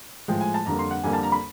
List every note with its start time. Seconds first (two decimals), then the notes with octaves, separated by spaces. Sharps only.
0.28 A2 F3 G#3 G5
0.41 G#5
0.54 A5
0.66 F2 D3 G3 A#3 A#5
0.79 C6
0.91 F#5
1.04 F2 D3 G3 A#3 G#5
1.13 A5
1.23 A#5
1.32 B5